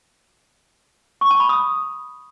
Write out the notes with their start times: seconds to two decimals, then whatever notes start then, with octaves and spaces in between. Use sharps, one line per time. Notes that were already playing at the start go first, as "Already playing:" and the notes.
1.21 C#6
1.31 A5
1.40 B5
1.49 D#6